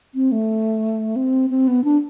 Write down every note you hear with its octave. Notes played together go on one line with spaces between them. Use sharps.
C4
A3
C4
C4
B3
D4